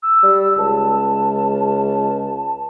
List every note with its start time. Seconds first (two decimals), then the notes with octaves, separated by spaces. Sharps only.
0.03 E6
0.23 G3
0.58 C#2 A5